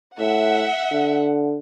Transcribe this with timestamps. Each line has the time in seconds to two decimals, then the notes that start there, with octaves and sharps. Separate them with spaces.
0.19 A2 E5 F#5
0.91 D3